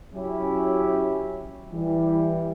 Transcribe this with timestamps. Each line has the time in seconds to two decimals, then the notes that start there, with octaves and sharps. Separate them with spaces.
0.13 F#3 C#4 E4 G4
1.72 E3 G3